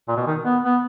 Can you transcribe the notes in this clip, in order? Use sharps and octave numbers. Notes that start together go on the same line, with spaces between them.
A#2
B2
D#3
B3
B3